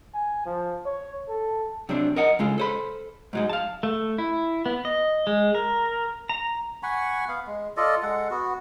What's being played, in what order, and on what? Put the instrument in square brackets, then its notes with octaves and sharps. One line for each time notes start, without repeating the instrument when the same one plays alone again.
[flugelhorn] G#5
F3
C#5
A4
[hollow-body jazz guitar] C3 F#3 C4 D4
A#4 D#5 F#5
C#3 G#3 F4 A4
A4 C5 B5
G#2 F#3 G#3
F5 A5
[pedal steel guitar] A3
E4
B3
D#5
G#3
A#4
A#5
[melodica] F#5 G#5 B5 C#6
B3 F5
G#3
F4 A4 D5 D#5
G#3 A4 F#5
B3 F#4